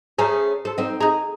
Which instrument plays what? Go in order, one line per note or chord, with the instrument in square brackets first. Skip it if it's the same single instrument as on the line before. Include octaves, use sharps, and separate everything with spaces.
[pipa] A3 G#5 A#5 [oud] C#4 G#4 C5
[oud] A4 [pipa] C5
[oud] C4 D#4
[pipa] D#4 A#5 [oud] G#4